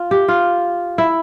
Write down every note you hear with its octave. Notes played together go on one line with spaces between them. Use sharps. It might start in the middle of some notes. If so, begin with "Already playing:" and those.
Already playing: F4
G4
F4
E4